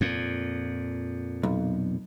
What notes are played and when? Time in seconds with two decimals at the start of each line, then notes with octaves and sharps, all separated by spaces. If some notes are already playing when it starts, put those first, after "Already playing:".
0.01 F2 A#2
1.43 B1